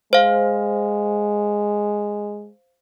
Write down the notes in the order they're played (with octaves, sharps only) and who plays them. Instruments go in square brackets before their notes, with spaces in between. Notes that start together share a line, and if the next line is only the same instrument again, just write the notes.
[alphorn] G#3 [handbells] C5 F5